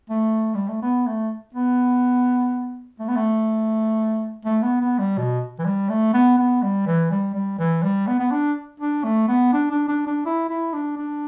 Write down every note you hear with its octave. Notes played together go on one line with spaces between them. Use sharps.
A3
G3
A3
B3
A3
B3
A3
B3
A3
A3
B3
B3
G3
B2
E3
G3
A3
B3
B3
G3
E3
G3
G3
E3
G3
B3
B3
D4
D4
A3
B3
D4
D4
D4
D4
E4
E4
D4
D4